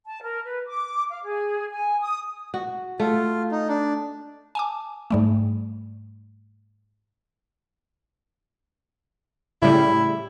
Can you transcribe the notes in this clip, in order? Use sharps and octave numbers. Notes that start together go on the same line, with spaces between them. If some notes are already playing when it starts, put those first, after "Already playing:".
A5
A#4
B4
D6
F5
G#4
G#5
D#6
F#4
A3 F4
D#4
D4
G#5 A5 D6
G#2 G3 A3
A2 C#3 G3 E4